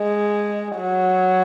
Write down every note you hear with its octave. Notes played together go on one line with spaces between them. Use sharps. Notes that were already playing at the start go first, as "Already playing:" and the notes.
Already playing: G#3
F#3